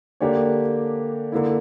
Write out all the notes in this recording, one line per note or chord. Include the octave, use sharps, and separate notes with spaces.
D3 A#3 D4 G4 C#5
D3 A#3 E4